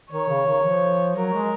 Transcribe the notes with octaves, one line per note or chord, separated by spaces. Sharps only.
D#3 C#5
C#3
D#3
F3
F#3 A#4
G#3